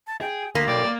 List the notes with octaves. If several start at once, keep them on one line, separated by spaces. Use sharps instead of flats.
A5
G#4 G5
D2 A#3 B6
B1 D5 G5
A#3